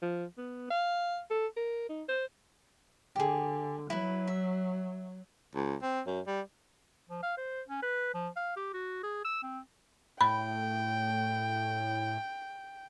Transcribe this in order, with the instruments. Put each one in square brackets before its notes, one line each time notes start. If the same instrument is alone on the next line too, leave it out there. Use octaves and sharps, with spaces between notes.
[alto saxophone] F3
B3
F5
A4
A#4
D#4
C5
[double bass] D3 [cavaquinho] G4 G#4
[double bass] F#3 [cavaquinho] E4 B4
[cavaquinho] E5
[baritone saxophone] C#2
C4
F#2
G3
[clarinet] F3
F5
C5
C#4
B4
F3
F5
G4
F#4
G#4
E6
C4
[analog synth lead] A2 [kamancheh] G5 [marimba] B5